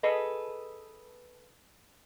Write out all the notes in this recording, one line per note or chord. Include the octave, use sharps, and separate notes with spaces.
G#4 A4 B4 D#5